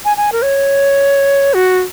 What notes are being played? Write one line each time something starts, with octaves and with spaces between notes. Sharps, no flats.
G#5
G#5
A#4
C#5
F#4